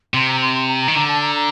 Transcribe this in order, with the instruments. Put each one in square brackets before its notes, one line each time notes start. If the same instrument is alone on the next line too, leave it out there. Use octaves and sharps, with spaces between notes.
[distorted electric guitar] C3 [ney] C6
[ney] A#5
C6
C6
A#5
A#5
[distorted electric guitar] D#3
[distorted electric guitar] D3 [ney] A#5
[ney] A5
A#5
A#5